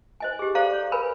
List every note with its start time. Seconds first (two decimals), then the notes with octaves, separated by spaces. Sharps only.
0.20 C5 D#5 G#5
0.39 G4 G#4
0.55 A4 C5 D5 F5 A#5
0.73 C#5
0.92 A#4 B4 G#5 B5